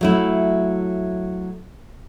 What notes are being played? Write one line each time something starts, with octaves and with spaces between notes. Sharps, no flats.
F#3 A3 E4